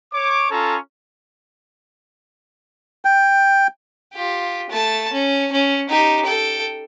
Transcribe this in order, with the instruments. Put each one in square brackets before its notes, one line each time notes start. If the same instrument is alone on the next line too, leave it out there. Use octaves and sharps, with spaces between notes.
[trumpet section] C#5 D6
C#4 F4 A4 C#5 A#5
[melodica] G5
[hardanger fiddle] F4 G4
A3 A5
C#4
C#4
D#4 G4
A4 G5